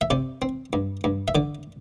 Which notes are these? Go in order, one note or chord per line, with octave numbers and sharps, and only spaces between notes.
E5
C3 D5
C4
G2
G2
E5
D3 D5